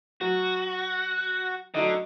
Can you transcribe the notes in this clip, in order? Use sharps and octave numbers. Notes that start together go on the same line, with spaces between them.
F#3 F#4
D3 F#3 D#4 D#5